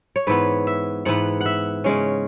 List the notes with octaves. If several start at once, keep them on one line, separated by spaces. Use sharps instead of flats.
C#5
G#2 E3 B3 B4
E5
G#2 E3 B3 F#5
F#5
E5
C#3 G#3 C#4